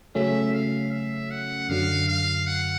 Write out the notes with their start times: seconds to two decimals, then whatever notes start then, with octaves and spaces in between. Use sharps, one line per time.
0.15 C#3 F#3 A3 C#4 E5
0.54 F5
0.92 E5
1.31 F#5
1.69 F#2 D3 F#3 F5
2.08 F5
2.47 F#5